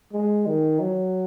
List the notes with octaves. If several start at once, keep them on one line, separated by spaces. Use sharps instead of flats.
G#3
D#3
F#3